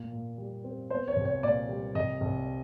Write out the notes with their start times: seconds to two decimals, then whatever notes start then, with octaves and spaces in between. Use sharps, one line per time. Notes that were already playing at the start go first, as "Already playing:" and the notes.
Already playing: A#2
0.12 A#2
0.38 G3
0.64 C4
0.90 B3 C5
1.08 C#5
1.16 C2
1.25 C#5
1.43 A#2 D5
1.69 G3
1.95 C2 D#5
2.21 C2